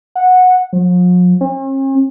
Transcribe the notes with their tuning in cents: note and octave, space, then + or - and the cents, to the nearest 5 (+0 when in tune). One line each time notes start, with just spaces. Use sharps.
F#5 -10
F3 +45
C#4 -45